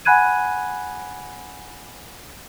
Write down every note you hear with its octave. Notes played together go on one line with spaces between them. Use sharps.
F#5 G#5 B5 F#6 G#6 D#7